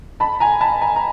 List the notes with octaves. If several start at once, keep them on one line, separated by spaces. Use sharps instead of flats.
A5 B5
G#5 A#5
A5 B5
G#5 A#5
A#5